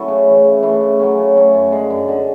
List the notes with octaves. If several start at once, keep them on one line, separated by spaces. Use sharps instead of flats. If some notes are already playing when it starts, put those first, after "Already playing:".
Already playing: F#3 A3 C#4 E4
C#3
E3 A3
C#3
E3 A3
C#3
F#3 A3 C#4
C#3
F#3 A3 C#4
F#2
D3 G#3 D4
F#2
D3 G#3 D4